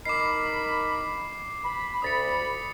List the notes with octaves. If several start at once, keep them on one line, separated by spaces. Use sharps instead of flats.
D#4 A#4 B5 D6 C7
B5
D2 B5 D#6 A6 C#7